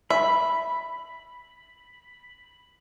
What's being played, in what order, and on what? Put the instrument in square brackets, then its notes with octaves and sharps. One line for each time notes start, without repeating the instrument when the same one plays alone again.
[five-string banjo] E5 [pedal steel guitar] B5